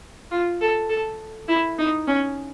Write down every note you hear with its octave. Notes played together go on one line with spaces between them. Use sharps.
F4
A4
A4
E4
D#4
C#4